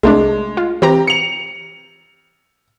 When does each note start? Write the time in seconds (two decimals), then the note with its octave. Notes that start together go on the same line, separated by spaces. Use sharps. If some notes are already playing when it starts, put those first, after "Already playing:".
0.03 C2 G#3 A3 D4
0.57 F4
0.82 E3 C4 G4 A#5
1.07 C#7 F7